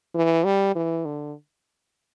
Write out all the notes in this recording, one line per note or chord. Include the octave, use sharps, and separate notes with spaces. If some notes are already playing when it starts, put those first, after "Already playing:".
E3
G3
E3
D3